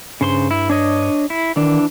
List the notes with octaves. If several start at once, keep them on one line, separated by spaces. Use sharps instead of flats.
G2 C#3 C5 C6
E4
D4 C#5 D#5
E4
D#3 E3 D4